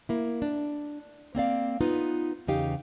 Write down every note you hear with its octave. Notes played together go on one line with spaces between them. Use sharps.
A#3 E4
D4
A#3 C4 D5 F5
B3 D#4 F4 B4
E2 C#3 D#4 G4 F5